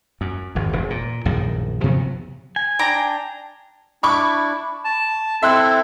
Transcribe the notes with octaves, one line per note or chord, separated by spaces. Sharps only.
F#2
G#1 F2
E1 C#3
A#2
A#1 F#2 A2 D#3
C3 F3 F#3 B3
G#5
D4 G5 A#5
D4 E4 B5 C#6 D6
A5
C4 E4 A4 E5 C6 F#6